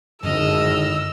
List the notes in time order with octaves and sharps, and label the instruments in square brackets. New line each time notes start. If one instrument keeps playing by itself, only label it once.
[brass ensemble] G#1 A2 [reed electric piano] F#2 D3 [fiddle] D#5 F6 [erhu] E6